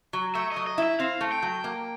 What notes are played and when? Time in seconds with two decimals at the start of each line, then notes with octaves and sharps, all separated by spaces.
0.13 F#3
0.35 A3 E5
0.52 F#3 D#5
0.67 D#5
0.78 E4 E5
1.00 C4 F5
1.21 A3
1.32 G5
1.42 F#3
1.64 A#3